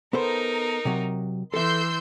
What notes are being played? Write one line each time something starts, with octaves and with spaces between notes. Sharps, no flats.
B3 D#4 A4 A#4 C5
C3 F#3
E3 A4 E5 C6 E6 G6